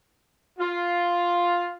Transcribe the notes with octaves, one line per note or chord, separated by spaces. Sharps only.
F4